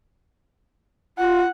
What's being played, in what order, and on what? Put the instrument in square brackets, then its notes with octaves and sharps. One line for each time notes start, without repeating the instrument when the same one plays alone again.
[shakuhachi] F4 [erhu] F#5